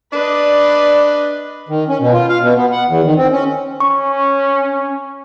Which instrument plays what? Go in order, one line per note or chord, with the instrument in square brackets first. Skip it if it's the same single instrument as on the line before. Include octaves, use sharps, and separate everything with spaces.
[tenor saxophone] D4 [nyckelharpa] B4 D#5 [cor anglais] D5
[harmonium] D#3
C#4
B2
F4
F5
B2
B3
F#5
E2
D#3
C4
C#4
[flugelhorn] C#4 [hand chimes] C#6